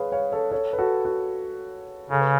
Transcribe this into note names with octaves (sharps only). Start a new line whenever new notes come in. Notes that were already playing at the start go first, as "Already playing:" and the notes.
Already playing: G#4 B4 C#5 F5
C#5 F5
A4 C#5
A4 C#5
B4
F#4 A4
F#4
C#3 A4
B4